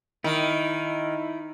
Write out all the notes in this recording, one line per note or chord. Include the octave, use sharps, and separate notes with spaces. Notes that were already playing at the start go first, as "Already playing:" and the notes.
D#3 D#4 E4